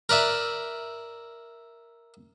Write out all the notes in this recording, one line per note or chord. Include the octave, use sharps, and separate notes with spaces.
A#4 B4 D5 E5